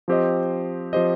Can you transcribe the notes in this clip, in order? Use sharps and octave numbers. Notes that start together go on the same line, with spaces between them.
F3 C4 G4 C5 D#5
F3 C4 G4 C5 D#5